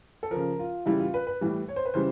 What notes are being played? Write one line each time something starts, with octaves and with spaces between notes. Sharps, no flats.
A4
C#3 F3 A#4
F4
C#3 E3 G3 E4
F4
B4
B4
A2 E3 G3
C#5
C5
B4
C#3 E3 G3 C5